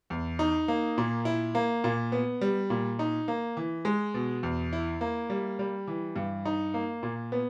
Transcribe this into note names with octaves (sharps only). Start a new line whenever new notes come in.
E2
D#4
A#3
A#2
E4
A#3
A#2
B3
G3
A#2
D#4
A#3
E3
G#3
B2
E2
E4
A#3
G3
G3
E3
G2
D#4
A#3
A#2
B3